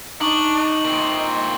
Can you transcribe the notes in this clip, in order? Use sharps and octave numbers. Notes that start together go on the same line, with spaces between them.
D4 D#4 C#6 F#7
A#2 C4